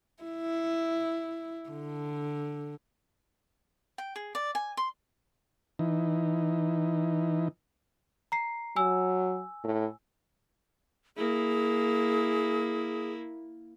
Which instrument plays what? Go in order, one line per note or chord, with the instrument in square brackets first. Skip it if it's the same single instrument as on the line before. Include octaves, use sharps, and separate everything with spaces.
[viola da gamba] E4
D3
[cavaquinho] G5
G#4
D5
G#5
C6
[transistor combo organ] E3 D#4
[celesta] A#5 C7
[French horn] F#3 [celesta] G#5 E6
[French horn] A2
[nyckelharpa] A#3 E4 [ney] G#4